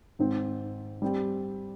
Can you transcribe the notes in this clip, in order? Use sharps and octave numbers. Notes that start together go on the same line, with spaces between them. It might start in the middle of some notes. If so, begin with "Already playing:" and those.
G#2 D#3 G#3 C4
G3 C4 G4